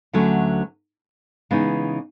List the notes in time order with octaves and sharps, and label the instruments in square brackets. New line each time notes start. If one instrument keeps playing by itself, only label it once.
[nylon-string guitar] D2 D3 F#3 A3 C#4
C#3 E3 G#3 B3 D#4